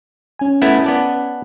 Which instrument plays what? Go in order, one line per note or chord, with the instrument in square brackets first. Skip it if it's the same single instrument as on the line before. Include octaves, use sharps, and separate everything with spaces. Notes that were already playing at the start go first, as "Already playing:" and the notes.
[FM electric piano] C#4 G#5
[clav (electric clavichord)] A3 B3 E4
B3 D5 A5